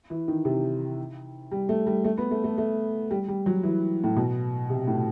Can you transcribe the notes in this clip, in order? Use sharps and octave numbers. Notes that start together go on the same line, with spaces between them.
E3
D#3
C3
G3
A3
G3
A3
B3
A3
A3
A3
G3
G3
F#3
E3
A2
B2
C3
A2